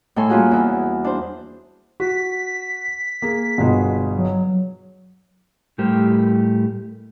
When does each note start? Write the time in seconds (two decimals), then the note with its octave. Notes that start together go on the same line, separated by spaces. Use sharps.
0.16 A2 G#3 A4 G#5 C6 C#6
0.29 G3 A#3 C#4 F4 F#4 G#4
0.51 E2 E5
1.04 D4 C5
2.00 F#4 B6
3.22 A#3 G#4
3.58 G1 B2 G#3
4.18 F#3
5.78 A2 G3 A3 G4 A#4 C5